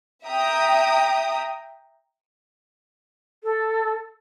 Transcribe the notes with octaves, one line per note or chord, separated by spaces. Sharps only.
E5 G5 A#5 D#6
A4